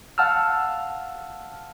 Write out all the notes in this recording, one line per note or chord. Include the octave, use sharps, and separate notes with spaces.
F5 F#5 A5 E6 F6